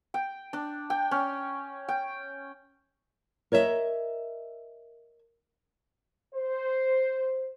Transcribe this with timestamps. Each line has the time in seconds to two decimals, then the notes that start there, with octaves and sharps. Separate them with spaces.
0.14 G5
0.53 D4
0.90 G5
1.11 C#4
1.88 G5
3.52 A#4 C#5 D#5 E5
6.34 C5